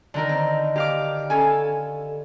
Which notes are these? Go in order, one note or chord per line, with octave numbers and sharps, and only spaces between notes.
D3 D#3 A#4
C4
D#3 G4 F5 D6
C#4 A4 G#5